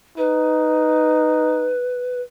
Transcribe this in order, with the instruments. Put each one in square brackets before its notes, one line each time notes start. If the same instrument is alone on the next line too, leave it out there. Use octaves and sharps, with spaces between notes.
[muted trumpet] D#4 [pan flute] B4